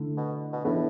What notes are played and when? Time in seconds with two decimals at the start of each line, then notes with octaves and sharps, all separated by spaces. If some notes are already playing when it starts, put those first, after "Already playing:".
Already playing: D3 A3 E4
0.17 B2
0.53 B2
0.64 A2 E3 B3 D4 A4